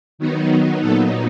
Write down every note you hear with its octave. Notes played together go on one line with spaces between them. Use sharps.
D#3 F#3 B3 D#4
A#2 F#3 B3 D#4 A4